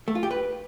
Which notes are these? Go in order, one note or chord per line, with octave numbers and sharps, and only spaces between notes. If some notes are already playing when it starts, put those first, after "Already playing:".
A3
F4
G4
B4